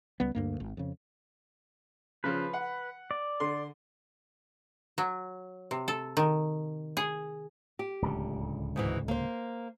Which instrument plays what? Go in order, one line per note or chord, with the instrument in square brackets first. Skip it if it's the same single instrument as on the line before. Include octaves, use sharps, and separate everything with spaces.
[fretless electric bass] C#2 G3 B3
D2 G2 A#3
G#1
F2 C#3
[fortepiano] C#3 F3 [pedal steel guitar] B4
[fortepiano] F#5
[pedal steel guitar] D5
[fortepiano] D3 C6
[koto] F#3
C3
A4
D#3
G#4
[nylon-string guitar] G4
[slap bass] D1 C#2 D3
[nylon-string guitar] G#2 B2 E3
A#3 C5